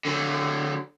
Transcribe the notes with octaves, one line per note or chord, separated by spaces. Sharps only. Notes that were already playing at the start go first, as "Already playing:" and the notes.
D3 F#3